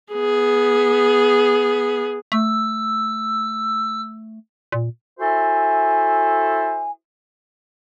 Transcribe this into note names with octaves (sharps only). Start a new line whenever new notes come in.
B3 G#4
A3 E6
A#2
E4 F#4 A4 C5 E5 G#5